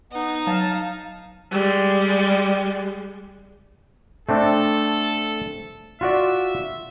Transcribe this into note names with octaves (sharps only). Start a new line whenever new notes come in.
B3 D#4
F#3 F5 A5
G3 G#3
A3 C4 D4 A4
F4 F#4 D5 E5